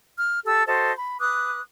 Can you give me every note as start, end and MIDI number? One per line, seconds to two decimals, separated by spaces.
0.17 0.38 89
0.45 0.63 67
0.45 0.63 69
0.45 0.63 88
0.66 0.91 66
0.66 0.91 69
0.66 0.91 72
0.66 0.91 75
0.96 1.18 83
1.20 1.60 71
1.20 1.60 86
1.20 1.60 87
1.20 1.60 90